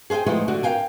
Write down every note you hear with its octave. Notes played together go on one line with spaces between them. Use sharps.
G#4 C5 F5 G5 G#5
F3 G#3 A3 B3 D#4 E4
D3 F#4 D5
A#4 B4 F5 G5 G#5